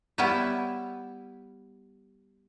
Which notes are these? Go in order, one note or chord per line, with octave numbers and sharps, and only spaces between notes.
G3 B3 E4 B4 C#5 E5